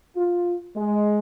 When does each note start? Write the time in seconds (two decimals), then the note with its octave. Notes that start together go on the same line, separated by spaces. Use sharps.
0.16 F4
0.76 G#3